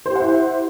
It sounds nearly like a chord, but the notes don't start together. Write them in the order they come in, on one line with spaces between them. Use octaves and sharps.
C5 G4 F#5 E4